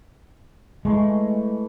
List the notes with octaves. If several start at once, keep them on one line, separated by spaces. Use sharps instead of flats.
E3 G#3 A3